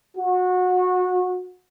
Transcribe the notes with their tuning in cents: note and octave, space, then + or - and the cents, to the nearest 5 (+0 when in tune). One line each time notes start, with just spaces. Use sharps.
F#4 -25